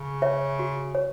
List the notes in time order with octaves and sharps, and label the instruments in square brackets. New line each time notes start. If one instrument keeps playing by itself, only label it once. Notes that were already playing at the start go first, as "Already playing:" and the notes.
Already playing: [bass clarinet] C#3
[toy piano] C#5 E5
F#4
C#5